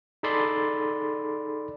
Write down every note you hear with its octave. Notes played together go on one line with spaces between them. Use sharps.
D#4 G#4 A4 D5 B5 C6